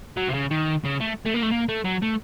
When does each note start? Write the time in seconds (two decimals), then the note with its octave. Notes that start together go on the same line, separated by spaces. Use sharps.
0.17 F#3
0.29 C3
0.34 C#3
0.51 D#3
0.84 C#3
1.00 A3
1.26 A3
1.34 A#3
1.43 A3
1.51 A#3
1.69 A3
1.84 F#3
2.02 A3